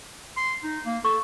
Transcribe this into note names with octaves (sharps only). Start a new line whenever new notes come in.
C6
D#4
A#3
A4 C#6